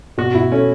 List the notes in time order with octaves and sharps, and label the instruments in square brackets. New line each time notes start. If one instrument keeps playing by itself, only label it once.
[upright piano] B2 [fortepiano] F#4
[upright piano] B2 [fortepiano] E4
[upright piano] A3 [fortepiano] C#4